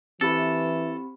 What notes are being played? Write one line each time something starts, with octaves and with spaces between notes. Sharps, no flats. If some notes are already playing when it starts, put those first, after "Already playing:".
E3 C4 E4 G4 A4 B5